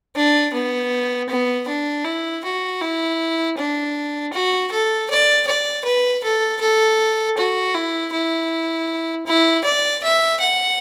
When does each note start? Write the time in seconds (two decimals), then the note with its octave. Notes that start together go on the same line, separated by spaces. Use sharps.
0.16 D4
0.54 B3
1.29 B3
1.68 D4
2.05 E4
2.44 F#4
2.81 E4
3.58 D4
4.33 F#4
4.71 A4
5.10 D5
5.47 D5
5.85 B4
6.23 A4
6.61 A4
7.37 F#4
7.74 E4
8.12 E4
9.26 E4
9.64 D5
10.03 E5
10.40 F#5